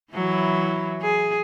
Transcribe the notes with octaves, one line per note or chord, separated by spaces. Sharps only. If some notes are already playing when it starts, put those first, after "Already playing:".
E3 F#3 E4
G#4